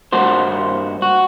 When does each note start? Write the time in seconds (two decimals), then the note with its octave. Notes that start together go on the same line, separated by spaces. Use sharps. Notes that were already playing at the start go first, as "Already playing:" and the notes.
0.12 G2 A#3 F#4 C5
1.02 F#4